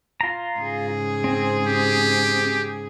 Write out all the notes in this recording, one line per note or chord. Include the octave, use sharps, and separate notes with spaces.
F4 A#5
G#2 C#3 G#4
C4
G4